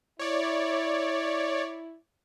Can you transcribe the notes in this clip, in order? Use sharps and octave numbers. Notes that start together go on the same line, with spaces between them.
E4 C#5 D5